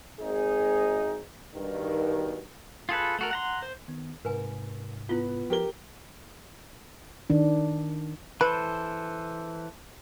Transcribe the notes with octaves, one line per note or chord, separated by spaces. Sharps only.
G#1 D#4 G#4
G2 B2 D#3
F4 G#4 A4 B4
A3 F#4 A#4
F#5 A#5 C6
C5
D#3 B3
G#2 C3 A#4 B4 G#5
B3 E4 F4
F3 G4 A4 A#4 G7
D#3 D4
E3 A4 B4 C5